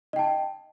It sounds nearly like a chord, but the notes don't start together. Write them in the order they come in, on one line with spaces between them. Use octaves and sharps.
D#5 G5 A5